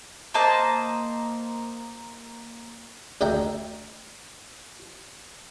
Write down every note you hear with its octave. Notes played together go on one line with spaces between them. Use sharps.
A#3 C5 D#5 A5
D2 G#3 A3 D4 G5 A#5